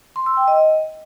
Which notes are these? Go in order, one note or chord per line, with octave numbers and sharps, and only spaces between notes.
C6
E6
G5
D#5